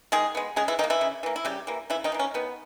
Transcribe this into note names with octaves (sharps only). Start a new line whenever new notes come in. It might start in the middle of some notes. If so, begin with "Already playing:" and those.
D#3 G#3 G#4
G#3 B3
C#3 G#3 G#4
E3 E4
D#3 E3 D#4
A#3
E3 E4
C#3
E3 A#3
E4
C#3 G3 G4
E3 A#3
C#3 E3 E4
D#3 D#4
E3 A#3
C#4
D#3 B3